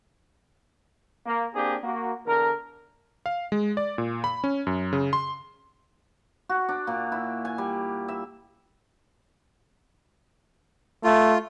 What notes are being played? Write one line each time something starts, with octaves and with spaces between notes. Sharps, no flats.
A#3
A#3 C4 D4 G4 G#4
A#3 F#4
E2 D3 A#4
F5
G#3
D5
A#2
B5
C#4
F#2
C#3
C6
F#4
D4
A#2
E4
G#5
G3
E5
A3 F4